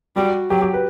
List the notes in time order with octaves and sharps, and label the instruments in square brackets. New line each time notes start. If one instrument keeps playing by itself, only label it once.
[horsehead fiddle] G3 [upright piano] F#4
[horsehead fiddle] F#3 [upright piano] G4
[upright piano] G4
B4